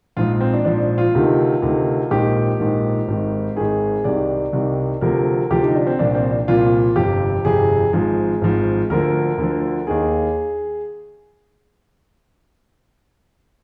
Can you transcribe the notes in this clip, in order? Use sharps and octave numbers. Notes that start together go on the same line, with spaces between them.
A#1 G#2 F3 F4
C4
D4
A#1 G#2 F3 D4
F4
D2 C3 D#3
D2 C3 D#3
A#1 G#2 D#3 G4
A#1 G#2 D#3
G#1 G#2 D#3
G#1 G#2 D#3 G#4
C2 C3 D#3 D5
C2 C3 D#3
D2 C3 F3 A#4
D2 C3 F3 G4
D#4
D4
C4
C2 A#2 F3 D4
C4
D4
C2 A#2 F3 F4
G1 F2 C3 G4
G1 F2 C3 G#4
G#1 G#2 F3 G#4
G#1 G#2 F3
D2 D3 F3 A#4
D2 D3 F3
D#2 D#3 G#4